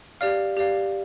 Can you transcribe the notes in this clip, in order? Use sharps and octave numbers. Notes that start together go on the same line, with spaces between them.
G4 D5 F5 F6
G4 D5 F5